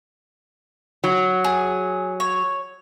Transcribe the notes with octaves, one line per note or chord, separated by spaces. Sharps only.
F#3
G#4
C#5